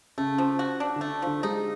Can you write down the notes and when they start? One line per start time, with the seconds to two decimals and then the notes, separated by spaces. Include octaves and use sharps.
0.18 C#3 A3
0.38 F3
0.59 F#4
0.80 D4
0.96 D3
1.01 A3
1.22 D3 F3
1.43 G#3 D#4